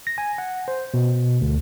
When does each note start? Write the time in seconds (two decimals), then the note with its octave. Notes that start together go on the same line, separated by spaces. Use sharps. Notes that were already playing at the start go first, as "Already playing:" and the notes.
0.07 A#6
0.18 G#5
0.38 F#5
0.68 C5
0.94 B2
1.41 D2